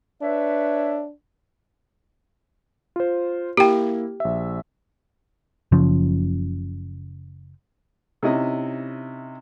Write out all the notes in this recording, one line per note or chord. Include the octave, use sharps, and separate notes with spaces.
D4 B4 C#5 E5
F4 C5
A#3 E4 G4 G5
A#1 E5
F#1 C#3 F3
C3 C#4 D#4 E4 D#5